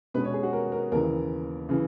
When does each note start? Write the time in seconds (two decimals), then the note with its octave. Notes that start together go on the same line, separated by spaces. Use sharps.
0.14 B2 G#3 C#4 B4
0.25 C#5
0.34 G#4
0.43 F#4
0.53 A#4
0.72 A#4
0.92 D#2 C#3 E3 A#4
1.69 C#3 E3